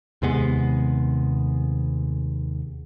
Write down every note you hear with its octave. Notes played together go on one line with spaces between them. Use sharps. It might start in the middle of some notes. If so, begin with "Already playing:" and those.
D#2 C3 G#3 B3